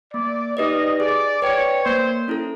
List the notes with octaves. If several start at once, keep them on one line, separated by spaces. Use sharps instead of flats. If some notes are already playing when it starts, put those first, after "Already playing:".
A#3 D5
D#4 G4 B4 D5 D#5
G#4 D5
B4 C#5 D5 G5
A#3 C5
C#4 E4 A4